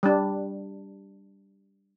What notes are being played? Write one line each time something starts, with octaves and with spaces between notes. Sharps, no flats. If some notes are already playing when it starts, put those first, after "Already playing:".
G3 D4